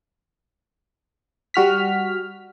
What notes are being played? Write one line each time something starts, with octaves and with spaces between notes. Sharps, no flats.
G3 F#4 F6 B6